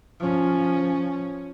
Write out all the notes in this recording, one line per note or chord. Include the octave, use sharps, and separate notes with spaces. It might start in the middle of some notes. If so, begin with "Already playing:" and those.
F3 C#4